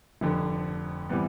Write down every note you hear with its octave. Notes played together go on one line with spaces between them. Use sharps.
F1 F2 D3
C3 E3 G3 B3